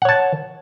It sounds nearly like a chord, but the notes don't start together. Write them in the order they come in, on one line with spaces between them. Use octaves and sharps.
F#5 C#5 A5